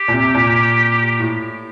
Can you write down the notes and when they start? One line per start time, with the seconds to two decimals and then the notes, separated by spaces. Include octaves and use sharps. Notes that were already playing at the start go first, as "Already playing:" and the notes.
Already playing: G4
0.08 A#2
0.13 C3
0.34 A#2
1.19 A2